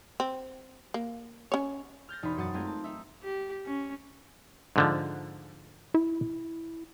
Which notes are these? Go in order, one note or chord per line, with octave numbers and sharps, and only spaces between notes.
C4
A#3
C#4 C#5
F6 G6 A6 A#6
E1 D#4 A#4 C5 B5
F#2 F#4 F#5 D#6 F#6 A6
G#3 A3 C4 F4 G#4 A#4
A5
D#4 E5
G4
C#4
G#2 D3 F3
E4